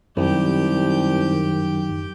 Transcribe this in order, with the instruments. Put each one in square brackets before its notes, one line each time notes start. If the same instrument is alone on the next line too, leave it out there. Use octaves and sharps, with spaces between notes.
[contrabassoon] C2 [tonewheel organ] F#2 [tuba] D#3 [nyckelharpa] G4 G5